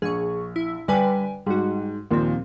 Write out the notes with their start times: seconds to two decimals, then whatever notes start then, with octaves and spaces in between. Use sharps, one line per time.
0.02 A#1 G#4 C#6
0.56 E4
0.88 D3 G3 B4 G5 G#5
1.46 G#2 G3 F#4
2.11 D#2 A#2 F3 C4